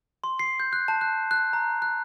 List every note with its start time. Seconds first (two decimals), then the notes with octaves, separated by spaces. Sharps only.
0.24 C6
0.39 C7
0.60 G6
0.73 F#6
0.88 A5
1.01 F#6
1.31 F#6
1.53 A#5
1.82 F#6